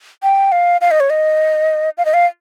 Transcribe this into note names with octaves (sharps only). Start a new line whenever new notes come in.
G5
F5
F5
D#5
C#5
D#5
F5
D#5
F5